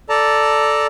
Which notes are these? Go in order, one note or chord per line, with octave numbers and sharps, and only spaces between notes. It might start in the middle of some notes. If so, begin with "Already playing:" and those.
A4 D5 A5 A#5